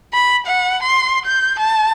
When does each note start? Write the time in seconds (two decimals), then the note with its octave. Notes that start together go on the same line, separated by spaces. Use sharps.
0.13 B5
0.46 F#5
0.82 C6
1.25 G6
1.59 A5